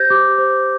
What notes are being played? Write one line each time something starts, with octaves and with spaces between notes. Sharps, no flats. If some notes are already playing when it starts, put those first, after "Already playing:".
Already playing: G4 C5 G6 G#6 A#6
G4 D6
C5